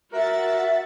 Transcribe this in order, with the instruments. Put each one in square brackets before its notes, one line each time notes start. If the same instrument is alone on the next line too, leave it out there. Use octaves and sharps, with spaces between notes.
[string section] F#4 F#5 A6 [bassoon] A#4 [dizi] E5